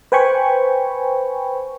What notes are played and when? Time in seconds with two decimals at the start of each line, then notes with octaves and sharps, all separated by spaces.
0.12 B4 C5 G5 G#5 B5 C#6